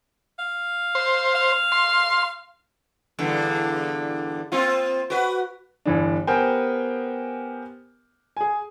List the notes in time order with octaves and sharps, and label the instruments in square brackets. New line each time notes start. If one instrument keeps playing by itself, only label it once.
[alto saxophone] F5
[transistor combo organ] C5
[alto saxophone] F5
[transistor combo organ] C6
[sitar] E2 G2 D3
A#3 C4 F4
F#4 B4
[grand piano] G1 E3 D4
B3 G4 A#4 C5 G5 G#5
G#4 G#5